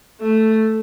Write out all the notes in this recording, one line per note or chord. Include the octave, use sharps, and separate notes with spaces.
A3